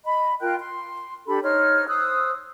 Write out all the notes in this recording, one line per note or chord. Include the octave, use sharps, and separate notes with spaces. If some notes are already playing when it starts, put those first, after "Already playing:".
D#5 B5
F4 A#4 G5 F#6
C6
D4 G4 A4 B5
D#4 C5 C#5 F6
C5 D#6 E6 F#6